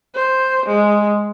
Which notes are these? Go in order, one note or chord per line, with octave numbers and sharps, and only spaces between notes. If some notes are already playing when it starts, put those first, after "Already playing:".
C5
G#3